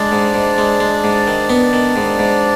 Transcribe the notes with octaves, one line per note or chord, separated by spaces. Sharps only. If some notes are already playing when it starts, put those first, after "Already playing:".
Already playing: G#3 D4 D5
G#2
G#2
G#3
G#3
G#2
D#3
B3
D#3
G#2
G#2